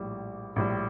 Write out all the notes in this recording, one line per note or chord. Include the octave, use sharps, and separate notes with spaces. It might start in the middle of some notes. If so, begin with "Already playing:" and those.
Already playing: A#1 A2 G3
A#1 A2 G3